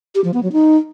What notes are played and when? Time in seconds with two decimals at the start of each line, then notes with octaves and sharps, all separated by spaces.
0.15 G4
0.24 F3
0.34 B3
0.43 F#3
0.52 D#4